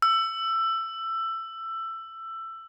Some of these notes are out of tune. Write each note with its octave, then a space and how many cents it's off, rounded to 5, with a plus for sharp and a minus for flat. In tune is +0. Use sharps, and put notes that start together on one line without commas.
E6 +20